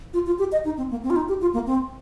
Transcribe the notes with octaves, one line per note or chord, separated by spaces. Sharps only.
F4
F4
G4
D#5
D#4
C4
A#3
C4
F4
D#4
G4
F4
A#3
C4